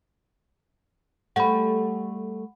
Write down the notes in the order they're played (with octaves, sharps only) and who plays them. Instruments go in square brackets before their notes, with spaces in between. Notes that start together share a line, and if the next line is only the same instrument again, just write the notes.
[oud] G3 A3 [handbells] F#5 B5